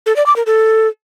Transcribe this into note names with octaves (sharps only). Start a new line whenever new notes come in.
A4
D5
D6
A#4
A4